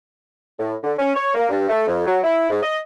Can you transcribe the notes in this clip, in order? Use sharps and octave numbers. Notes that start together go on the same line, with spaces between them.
A2
D3
C#4
C#5
A#3
G2
A3
F2
F#3
E4
G#2
D#5